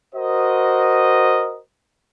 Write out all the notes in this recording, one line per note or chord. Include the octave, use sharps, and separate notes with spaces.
F#4 A#4 C5 D#5